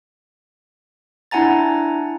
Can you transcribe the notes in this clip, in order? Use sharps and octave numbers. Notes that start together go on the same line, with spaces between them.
D4 E4 F#5 G#5 A#5 A6